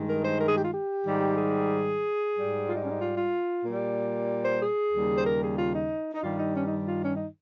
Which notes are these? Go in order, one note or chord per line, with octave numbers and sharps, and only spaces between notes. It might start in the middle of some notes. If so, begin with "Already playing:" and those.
Already playing: G2 D#3 G#3
A#4
C5
A#4
G#4
G4
F4
G4
G#2 D#3 G3
G#4
G#2 G3
F4
D#4
C#4
D#4
F4
F4
A#2 G3
C5
G#4
D#2 C#3 G3
C5
A#4
G#4
F4
D#4
D#4
G2 D#3 G3 F4
D#4
C#4
D#4
F4
C#4
D#4